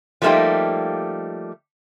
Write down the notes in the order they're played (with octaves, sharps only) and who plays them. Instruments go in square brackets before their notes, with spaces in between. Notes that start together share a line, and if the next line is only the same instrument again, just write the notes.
[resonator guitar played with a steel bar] F3 G3 A3 A#3 D#4 G4